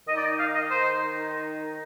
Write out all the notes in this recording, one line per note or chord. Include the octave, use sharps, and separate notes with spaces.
D#3 D#4 D#5
D5
D#5
F5
D#5
C5